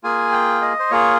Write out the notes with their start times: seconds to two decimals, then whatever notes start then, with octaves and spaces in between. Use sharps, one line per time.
0.03 A#3 F4 G#4 G#5
0.32 G5
0.62 D#5
0.79 C5
0.90 A#3 F4 G#4 C#5